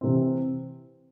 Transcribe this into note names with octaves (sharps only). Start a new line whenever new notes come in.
C3 E3 C4